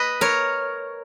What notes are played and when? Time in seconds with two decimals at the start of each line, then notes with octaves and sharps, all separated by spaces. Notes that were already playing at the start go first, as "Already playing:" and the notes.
Already playing: B4 D#5
0.21 A#4 C#5